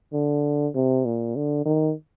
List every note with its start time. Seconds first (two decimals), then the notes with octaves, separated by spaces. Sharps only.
0.13 D3
0.75 C3
1.05 A#2
1.36 D3
1.66 D#3